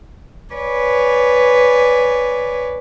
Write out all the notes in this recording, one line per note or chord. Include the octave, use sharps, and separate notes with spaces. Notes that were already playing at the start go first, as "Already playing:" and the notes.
B4 C#5 D5 G#5